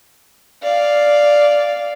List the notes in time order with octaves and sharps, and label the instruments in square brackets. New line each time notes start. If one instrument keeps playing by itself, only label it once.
[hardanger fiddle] D5 F5